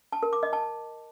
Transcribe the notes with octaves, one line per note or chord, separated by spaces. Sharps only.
A5
A#4
D6
D#5
A5